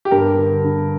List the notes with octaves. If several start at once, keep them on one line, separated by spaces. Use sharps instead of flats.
G4
G2 A#4
D3
D3